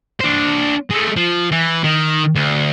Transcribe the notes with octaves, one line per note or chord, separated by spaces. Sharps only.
D4 C5
G#3 A3
F3
E3
D#3
D2